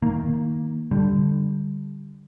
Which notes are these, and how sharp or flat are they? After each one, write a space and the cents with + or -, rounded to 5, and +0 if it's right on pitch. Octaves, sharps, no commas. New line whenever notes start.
D#3 +10 A#3 +0
D3 +0 G3 +0